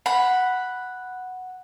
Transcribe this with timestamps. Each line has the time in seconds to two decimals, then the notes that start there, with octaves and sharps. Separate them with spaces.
0.06 F#5 B5